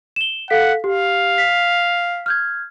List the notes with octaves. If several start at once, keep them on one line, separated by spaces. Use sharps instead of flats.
E7 G7
A4 F5 F#5 B6
G4 F5
B6
F6 G6 G#6